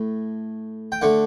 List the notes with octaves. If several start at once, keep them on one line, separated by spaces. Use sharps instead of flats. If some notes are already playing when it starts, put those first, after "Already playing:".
Already playing: A2 A3
G5
D3 A3 F#5